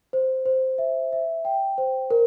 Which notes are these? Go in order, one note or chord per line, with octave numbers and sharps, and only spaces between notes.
C5
C5
E5
E5
G5
C5
A#4